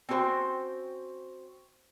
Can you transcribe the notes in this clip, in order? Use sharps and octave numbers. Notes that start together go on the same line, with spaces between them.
C4 C#4 F#4 A4 C5 G5